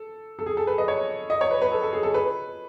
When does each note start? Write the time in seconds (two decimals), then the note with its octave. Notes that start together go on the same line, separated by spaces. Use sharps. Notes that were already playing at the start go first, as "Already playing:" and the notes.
Already playing: A4
0.39 A4
0.46 G#4
0.57 A4
0.67 B4
0.78 D#5
0.88 C#5
1.30 D#5
1.41 C#5
1.51 B4
1.62 B4
1.72 A4
1.82 A4
1.93 G#4
2.03 A4
2.14 B4